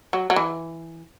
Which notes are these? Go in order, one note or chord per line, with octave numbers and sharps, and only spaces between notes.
F#3
F#3
E3